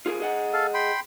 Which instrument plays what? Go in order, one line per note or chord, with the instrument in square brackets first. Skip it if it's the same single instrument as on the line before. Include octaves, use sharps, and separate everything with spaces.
[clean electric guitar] F4 G#4 A#4
G#4 D#5 F#5
[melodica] A4 F5
G5 B5 C6